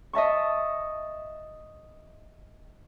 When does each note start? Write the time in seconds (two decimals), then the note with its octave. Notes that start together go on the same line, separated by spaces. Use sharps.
0.13 D#5 E5 A5 C#6